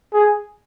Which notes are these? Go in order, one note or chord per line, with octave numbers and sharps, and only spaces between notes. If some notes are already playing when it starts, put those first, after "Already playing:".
G#4